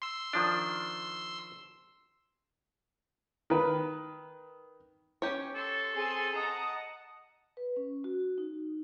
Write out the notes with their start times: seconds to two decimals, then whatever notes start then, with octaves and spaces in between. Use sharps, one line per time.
0.02 C6 E6
0.33 D#3 F3 D4
3.50 D#3 B4
5.22 C#4 G4 C#5
5.55 A4 C6 C#6
5.94 C4 G#4 G#5 C6
6.35 D#5 F#5 A5 A#5 D#6
7.57 B4
7.76 C#4
8.04 F#4
8.38 D#4